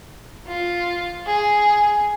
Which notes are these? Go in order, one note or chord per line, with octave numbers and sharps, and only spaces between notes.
F4
G#4